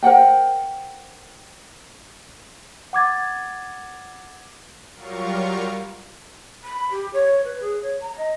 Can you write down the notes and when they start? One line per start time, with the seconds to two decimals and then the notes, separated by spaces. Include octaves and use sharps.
0.03 A#4 C5 F#5 G5
2.93 F#5 D6 G#6 A6
4.96 F#3 G3 F4 A#4 F5 C#6
6.64 B5
6.91 G4
7.14 C#5
7.44 B4
7.61 G#4
7.82 C#5
8.01 A#5
8.18 D#5